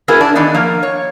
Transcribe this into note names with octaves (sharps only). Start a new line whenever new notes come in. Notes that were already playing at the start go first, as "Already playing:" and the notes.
B3 E4 F#4 G#4 A#4 B4
D4
D#3 E3 B3 D4 D#4
F3 A#3 A#4
C#5